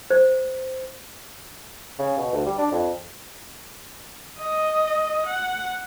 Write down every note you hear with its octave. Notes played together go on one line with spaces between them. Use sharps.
C5
C#3
B2
D2
G3
D4
F2
D#5
F#5